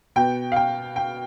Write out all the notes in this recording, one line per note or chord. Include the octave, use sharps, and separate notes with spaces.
B2 B3 G5
F5
G5
G5